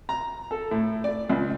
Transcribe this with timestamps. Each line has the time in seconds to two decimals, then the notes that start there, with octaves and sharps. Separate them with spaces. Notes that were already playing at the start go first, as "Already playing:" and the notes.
0.09 A#5
0.51 A4
0.71 A2
1.04 D5
1.30 C#2